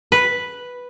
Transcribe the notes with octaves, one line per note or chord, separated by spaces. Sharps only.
B4